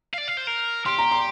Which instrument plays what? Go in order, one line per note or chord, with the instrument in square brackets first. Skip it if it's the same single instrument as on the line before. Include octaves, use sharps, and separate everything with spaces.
[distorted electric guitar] F5
D5
F5
C5
A#4
[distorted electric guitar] G4 [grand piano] C6
[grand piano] A#5
C6